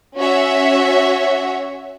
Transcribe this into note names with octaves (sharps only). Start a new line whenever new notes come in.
C#4 F#4 C#5 E5